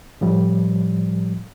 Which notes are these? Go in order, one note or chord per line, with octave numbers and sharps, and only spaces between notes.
A2 F3 G3